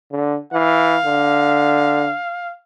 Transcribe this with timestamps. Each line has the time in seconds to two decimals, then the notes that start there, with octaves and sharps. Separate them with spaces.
0.11 D3
0.53 E3 F5
1.05 D3